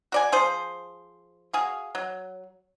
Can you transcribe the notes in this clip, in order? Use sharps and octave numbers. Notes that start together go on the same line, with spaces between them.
F#4 D5 G#5
F3 G#4 C5
F#4 G#4 F5
F#3